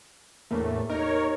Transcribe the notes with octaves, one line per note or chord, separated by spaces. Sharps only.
E2 A2 A3 A#3 D4
D#4 G4 A#4 C#5